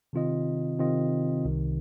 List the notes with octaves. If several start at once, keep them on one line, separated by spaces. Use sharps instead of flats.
C3 D#3 C4 F4 D#5
C3 D#3 C4 F4 D#5
C2 C3 D#3